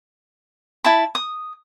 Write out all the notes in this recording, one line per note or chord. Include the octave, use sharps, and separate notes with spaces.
E4 A5 B5
D#6